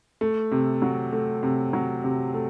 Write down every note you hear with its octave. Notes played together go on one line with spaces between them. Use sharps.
A3
C3
F#3
A3
C3
F#3
C3
A3